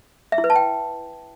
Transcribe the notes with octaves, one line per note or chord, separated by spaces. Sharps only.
E5
E4
B4
A5
G5